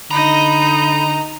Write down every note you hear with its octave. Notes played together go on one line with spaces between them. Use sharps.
D3 D#4 D#5 A#5 B5